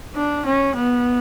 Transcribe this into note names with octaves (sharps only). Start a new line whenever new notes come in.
D4
C#4
B3